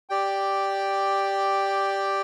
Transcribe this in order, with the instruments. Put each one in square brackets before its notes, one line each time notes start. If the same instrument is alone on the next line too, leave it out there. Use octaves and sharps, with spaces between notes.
[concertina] G4 D5 G5